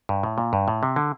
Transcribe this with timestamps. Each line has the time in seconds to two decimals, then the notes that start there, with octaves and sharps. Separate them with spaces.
0.09 G2
0.23 A2
0.38 A#2
0.53 G2
0.68 A2
0.83 C3
0.96 D3